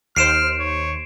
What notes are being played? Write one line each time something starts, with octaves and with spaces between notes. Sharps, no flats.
D#2 C5 F6 C7 D7 E7
C#5